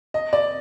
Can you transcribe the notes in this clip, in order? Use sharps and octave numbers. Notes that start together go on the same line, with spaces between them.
D#5
D5